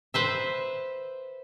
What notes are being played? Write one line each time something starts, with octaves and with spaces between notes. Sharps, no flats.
B4 C5 E5